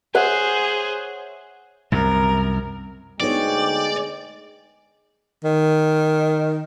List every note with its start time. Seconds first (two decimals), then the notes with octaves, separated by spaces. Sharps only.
0.14 G#4 C5 C#5 E5 F#5
1.92 C2 F#2 A#4
3.20 D2 G#3 B3 D#4 C#5 D5 G5
5.44 D#3